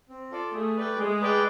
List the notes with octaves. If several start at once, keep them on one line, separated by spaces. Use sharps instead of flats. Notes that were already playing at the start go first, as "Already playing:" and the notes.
C4
F4 A4 D5
A3 G#4
B4 D5 G5
G#3 G#4
B4 D5 G5